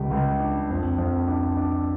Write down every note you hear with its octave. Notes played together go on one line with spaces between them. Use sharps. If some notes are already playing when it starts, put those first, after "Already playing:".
Already playing: C#2 G3
C#2
D4
F2
F2
D4
D4